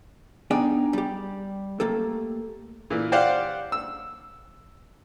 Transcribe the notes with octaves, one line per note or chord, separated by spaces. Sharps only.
B3 D4 D#4 G#4 G5 G#5
G3 G4
A3 A#3 G4 A4
A#2 E3
G4 C5 D5 F5 F#5
E6